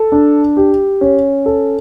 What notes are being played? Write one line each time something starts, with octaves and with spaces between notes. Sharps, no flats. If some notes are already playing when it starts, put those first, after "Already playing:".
Already playing: A4
D4
G4
C#4
A4